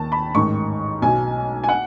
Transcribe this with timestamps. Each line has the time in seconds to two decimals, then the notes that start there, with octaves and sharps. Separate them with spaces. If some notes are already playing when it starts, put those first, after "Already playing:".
Already playing: D#2 D#3 A5
0.12 B5
0.35 A1 G#2 D#3 C#6
1.02 B1 B2 G#5
1.64 G#5
1.69 F#5